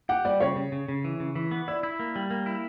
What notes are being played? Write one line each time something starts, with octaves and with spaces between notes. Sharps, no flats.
G4 F#5
G3 D5
C#3 C#5
C#3
C#3
C#3
E3
C#3
E3
B3
E4 D5
E4
A#3
G3
A#3
E4